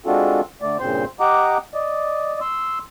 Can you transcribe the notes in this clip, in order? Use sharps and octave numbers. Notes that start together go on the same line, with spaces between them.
G#3 C4 D4 F4 F#4 A4
D3 A3 D5
G2 A#2 C#3 C4 C5 C6
G4 D#5 F#5 A#5 D6
D5 D#5
C6 E6